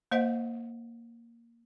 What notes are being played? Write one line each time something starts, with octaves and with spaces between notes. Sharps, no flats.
A#3 C5 D#5 F#5